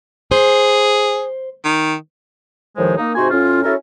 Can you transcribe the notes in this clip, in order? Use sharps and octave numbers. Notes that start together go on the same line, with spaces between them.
G#4 C5
D#3
D#2 A2 D#3 F3 G#3 C5
A#3 D#4
G#2 C3 D#4 F#4 G#5 C6
A2 C#4 F4
C#4 E4 F#4 A4 A#4 C#5